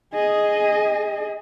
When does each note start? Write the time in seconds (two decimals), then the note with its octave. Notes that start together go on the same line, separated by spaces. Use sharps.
0.14 G#4 D#5